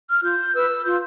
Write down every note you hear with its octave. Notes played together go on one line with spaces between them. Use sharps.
F6
F4 G6
B4 E6
F4 G6